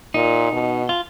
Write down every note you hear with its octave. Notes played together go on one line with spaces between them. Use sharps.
A#2 D#4
B2
F4